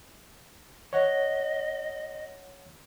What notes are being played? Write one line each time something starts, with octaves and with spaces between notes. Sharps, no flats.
C#5 D#5 F#5